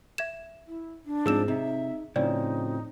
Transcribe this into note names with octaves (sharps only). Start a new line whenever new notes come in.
E5 G#6 E7
E4
D4
G#2 F3 C4 G#4 E6 E7
C3 D#4 E5
A2 C#3 F3 C4 D#4 D5